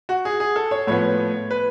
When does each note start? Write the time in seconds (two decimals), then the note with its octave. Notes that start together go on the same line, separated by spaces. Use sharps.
0.09 F#4
0.25 G#4
0.40 G#4
0.56 A4
0.71 C#5
0.87 A2 F3 B3 C#5
1.51 B4